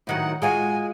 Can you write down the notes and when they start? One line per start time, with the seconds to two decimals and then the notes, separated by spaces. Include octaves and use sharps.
0.07 A2 D#3 F#3 F#5
0.42 G#3 F4 F#4 G#5